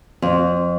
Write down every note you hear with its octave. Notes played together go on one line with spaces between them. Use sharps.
F2